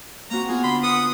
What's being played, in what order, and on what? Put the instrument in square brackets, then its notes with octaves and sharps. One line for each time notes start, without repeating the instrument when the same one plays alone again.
[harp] A#3 C4 F#4 [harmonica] A#5
[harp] B3 F4 [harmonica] G#4
[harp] D3 [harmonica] B5 C6
[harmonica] B3 D#6